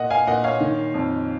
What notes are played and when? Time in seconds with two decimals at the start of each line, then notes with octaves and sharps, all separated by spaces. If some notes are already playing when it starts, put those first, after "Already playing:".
Already playing: A#2 D#5 F#5
0.10 F5 G#5
0.27 A#2 D#5 F#5
0.44 C#5 F5
0.60 D#3
0.94 F2